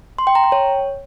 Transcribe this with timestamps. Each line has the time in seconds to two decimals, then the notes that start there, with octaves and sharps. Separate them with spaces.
0.19 C6
0.27 G5
0.35 A#5
0.44 G5
0.52 C#5